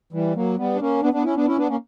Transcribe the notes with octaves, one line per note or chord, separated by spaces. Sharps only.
E3 G3
F#3 A#3
G3 B3
D4
A#3 C#4
B3 D4
B3 D4
C#4 E4
B3 D4
C#4 E4
B3 D4
A#3 C#4